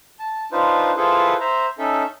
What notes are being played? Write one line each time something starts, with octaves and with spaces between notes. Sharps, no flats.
A5
D4 D#4 F4 B4 C5
E4 F4 G#4 A4 B4 C5
C5 E5 A#5
C#4 D#4 A4 E5